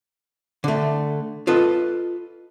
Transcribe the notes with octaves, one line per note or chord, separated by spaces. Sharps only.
D3 A3
F4 A4 B4 D#5